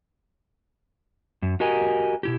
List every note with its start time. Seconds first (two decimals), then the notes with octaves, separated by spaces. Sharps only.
1.42 F#2
1.60 F#4 G4 A#4 D#5 G#5
2.23 B2 E4 G4